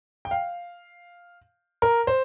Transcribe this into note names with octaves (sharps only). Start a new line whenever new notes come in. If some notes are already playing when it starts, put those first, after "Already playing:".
G5
F5
A#4
C5